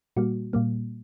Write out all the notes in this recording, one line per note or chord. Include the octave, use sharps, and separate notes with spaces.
A#2 G3 A#3 F#4
A#2 G3 A#3